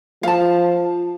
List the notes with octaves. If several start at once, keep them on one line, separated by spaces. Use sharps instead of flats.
F3 F5 A5